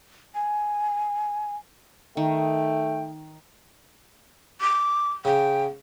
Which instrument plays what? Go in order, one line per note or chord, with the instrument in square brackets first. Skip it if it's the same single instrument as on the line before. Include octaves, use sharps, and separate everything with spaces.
[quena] G#5
[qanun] D#3 [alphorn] A3 [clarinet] G5
[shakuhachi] D6
[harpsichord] C#3 [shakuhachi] G5